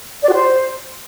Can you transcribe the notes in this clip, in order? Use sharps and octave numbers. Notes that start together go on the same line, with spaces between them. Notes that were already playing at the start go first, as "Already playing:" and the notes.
D5
F#4
C5